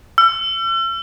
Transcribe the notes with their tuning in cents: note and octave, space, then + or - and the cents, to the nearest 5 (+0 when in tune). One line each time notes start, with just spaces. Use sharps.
E6 +40